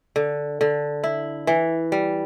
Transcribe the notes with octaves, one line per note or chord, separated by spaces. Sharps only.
D3
D3
E4
E3
G3